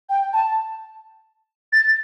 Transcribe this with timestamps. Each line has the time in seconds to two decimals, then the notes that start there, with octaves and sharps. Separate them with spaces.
0.09 G5
0.33 A5
1.73 A6